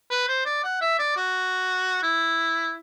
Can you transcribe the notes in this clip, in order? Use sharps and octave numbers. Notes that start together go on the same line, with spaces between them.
B4
C5
D5
F#5
E5
D5
F#4
E4